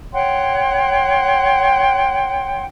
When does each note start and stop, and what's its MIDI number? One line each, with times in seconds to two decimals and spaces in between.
0.13 2.63 73
0.13 2.63 78
0.13 2.63 79
0.13 2.63 84